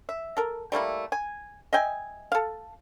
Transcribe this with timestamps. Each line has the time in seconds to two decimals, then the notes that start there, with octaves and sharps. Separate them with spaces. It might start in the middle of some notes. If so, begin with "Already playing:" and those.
0.09 E5
0.37 A4 A#4
0.72 G3 A3 A#3 E4
1.12 G#5
1.73 D#5 E5 G5 G#5
2.32 A4 F5